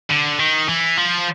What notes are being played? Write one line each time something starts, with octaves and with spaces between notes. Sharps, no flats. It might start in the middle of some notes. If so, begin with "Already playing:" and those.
D3
D#3
E3
F3